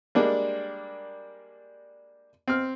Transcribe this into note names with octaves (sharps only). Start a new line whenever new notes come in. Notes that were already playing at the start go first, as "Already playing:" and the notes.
G3 G#3 A#3 D4
C4 F6